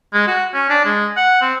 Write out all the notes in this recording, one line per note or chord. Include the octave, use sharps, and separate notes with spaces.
G#3
F#4
C#4
D4
G#3
F#5
C4